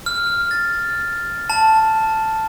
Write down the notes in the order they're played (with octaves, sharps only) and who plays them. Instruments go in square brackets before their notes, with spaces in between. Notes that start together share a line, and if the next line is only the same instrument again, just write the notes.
[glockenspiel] F6
A6
A5